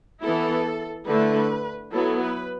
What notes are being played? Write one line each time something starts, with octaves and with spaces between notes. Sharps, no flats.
E3 B3 E4 A4
D3 A3 E4 B4
F#3 B3 E4 A4
B4